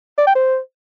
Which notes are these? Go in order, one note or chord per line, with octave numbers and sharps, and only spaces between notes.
D5
G5
C5